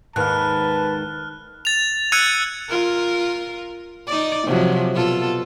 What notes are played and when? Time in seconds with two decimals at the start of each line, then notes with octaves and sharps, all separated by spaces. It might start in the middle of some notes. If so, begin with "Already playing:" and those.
0.16 D#2 G#2 D#3 B4 A5 F6 F#6
1.65 A6 F7
2.12 E6 F#6 G#6 A6 C#7 D#7
2.70 F4 A#4
4.07 D#4 D5
4.46 C3 F3 F#3
4.94 B2 F4 A4